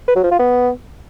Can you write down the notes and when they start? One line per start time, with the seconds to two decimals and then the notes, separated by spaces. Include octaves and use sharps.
0.08 B4
0.16 F#3
0.24 F3
0.31 F4
0.39 B3